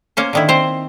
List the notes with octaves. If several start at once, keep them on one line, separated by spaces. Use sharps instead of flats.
A#3 C#4 C5
D3 D#3 E4
C4 C5